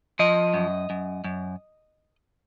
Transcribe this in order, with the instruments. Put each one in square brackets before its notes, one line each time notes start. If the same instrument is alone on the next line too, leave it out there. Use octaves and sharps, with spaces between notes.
[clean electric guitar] F3 D#5
F#2
F#2
F#2